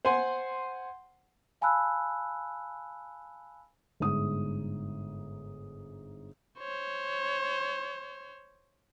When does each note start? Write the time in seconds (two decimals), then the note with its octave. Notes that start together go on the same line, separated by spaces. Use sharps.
0.05 C5 F#5 G#5 C6
1.61 F5 G#5 A5 B5 E6 F#6
4.00 G1 G#2 D#6
6.59 C5 C#5